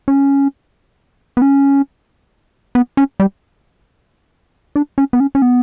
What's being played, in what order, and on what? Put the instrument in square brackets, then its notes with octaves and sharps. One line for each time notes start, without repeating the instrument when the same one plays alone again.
[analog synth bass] C#4
B3
C#4
B3
C#4
G3
D4
C#4
B3
C#4
C#4
B3